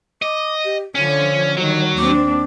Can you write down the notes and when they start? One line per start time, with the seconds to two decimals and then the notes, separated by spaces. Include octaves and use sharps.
0.22 D#5 D6
0.64 G4
0.95 D3 F3 C#4 C#5
1.57 D#3 F#3 G3
1.98 D#2 C4 D4 D6